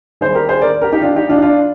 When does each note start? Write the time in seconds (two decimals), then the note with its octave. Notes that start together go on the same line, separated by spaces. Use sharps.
0.21 D#2 D#3 G3 G#4 C5
0.34 G4 A#4
0.49 G#4 C5
0.62 A#4 D5
0.81 G4 A#4
0.92 D#4 G4
1.02 D4 F4
1.16 D#4 G4
1.29 D4 F4
1.37 D#4
1.42 D4 F4